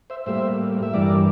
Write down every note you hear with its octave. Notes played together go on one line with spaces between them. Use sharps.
C5 E5
A2 G3 A#3 C5 E5
E5
G2 E3 G3 A#4 D5